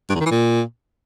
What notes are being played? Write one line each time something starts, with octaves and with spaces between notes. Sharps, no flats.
G2
E2
D#3
E3
A#2